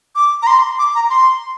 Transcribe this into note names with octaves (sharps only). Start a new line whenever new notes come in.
D6
A#5
C6
D6
A#5
C6